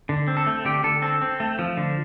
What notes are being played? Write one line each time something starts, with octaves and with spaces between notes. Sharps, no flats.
D3
C4
A4
A3
D3 G4
D3 A4
C4 A4
C4
A3
F3
D3